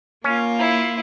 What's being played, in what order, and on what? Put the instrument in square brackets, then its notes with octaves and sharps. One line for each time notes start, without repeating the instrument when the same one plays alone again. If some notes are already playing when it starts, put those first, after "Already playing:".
[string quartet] A#3 F4 [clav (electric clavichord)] C#4
[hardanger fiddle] E4